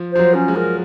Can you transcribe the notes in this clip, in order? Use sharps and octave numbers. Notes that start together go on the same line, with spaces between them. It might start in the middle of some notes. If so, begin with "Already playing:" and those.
Already playing: F3
F3 C5
F#3
C#4
G#3
A#4